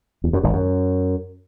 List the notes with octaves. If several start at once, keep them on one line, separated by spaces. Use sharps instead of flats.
E2
F#2
G#1 G#2
F#2